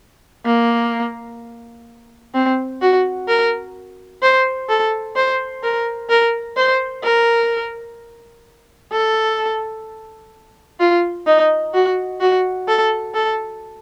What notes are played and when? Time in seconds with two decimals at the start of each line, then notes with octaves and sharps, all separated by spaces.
0.45 A#3
2.34 C4
2.81 F#4
3.28 A#4
4.22 C5
4.69 A4
5.16 C5
5.63 A#4
6.09 A#4
6.57 C5
7.03 A#4
8.92 A4
10.79 F4
11.26 D#4
11.74 F#4
12.20 F#4
12.68 A4
13.14 A4